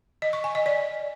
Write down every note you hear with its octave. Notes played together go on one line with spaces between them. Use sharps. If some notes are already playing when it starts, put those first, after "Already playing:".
D#5
C#6
G#5
D#5
D5